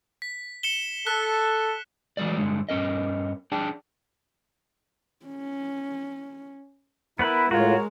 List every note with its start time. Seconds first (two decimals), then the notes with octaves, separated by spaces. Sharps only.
0.22 B6
0.63 C#7 E7 G7
1.07 A4 F#6 B6
2.17 E3 F#3 G#3 A3 D5
2.37 G2 D3 G#3
2.69 G2 C#4 A#4 D#5
3.52 D4 G#4 D5 G5 A5
5.26 C#4
7.19 B3 E4 A#4 B4 B5
7.51 A2 G#3 F4 F#4 A#4 C#5